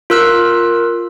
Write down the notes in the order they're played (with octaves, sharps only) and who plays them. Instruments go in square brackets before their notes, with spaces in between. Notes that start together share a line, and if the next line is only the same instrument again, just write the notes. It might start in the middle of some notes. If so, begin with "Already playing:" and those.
[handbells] F4 A#4 E6 F#6